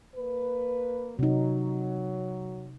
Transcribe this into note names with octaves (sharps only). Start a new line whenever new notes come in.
A#3 B4
C3 F#3 D#4